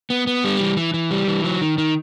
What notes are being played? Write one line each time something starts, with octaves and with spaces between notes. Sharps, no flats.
B3
B3
G3
E3
E3
E3
G3
E3
F#3
D#3
D#3